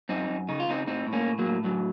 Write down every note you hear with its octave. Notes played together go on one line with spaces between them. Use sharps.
F#2 C4 D#4
F#2
C#3 D#4
F4
C#3 C4 D#4
A2 C4 D#4
A2
A#3 C#4
A2
F#3 A#3
A2
F#2 F#3